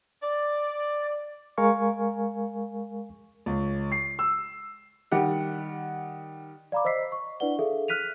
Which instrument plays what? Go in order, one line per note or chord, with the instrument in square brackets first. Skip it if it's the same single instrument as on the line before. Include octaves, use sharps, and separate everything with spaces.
[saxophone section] D5
[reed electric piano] G#3 A#4 F5 G#5 C#6
[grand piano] C#2
C7
E6
[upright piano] D#3 G3 G4 F#5
[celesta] D5 F5 A#5 B5 D6
C5 D#5 E6 B6 C7
C#6
D4 E4 B4 D5 F#5 G7
G#4 A4 E5 F5
F6 F#6 B6 D#7 F7